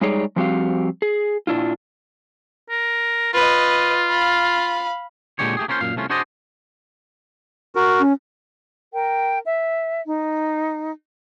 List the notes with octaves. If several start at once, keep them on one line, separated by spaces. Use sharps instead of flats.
G3 G#3 D#4 G#4 C#5 D5
F3 G3 C4 F#4 G4 F5
G#4
A#2 D4 E4 F4
A#4
F4 B4 D#5
F5 B5
A#2 D3 G#3 G4 C#5
A3 G4 G#4
A#3 C#4 F4 A#4 C5
F#2 A#2 F5
C2 A3 C#4 F4
D4 F#4 G#4 C5 D5 D#5
F#4 A#4
C#4
A#4 G5
E5
D#4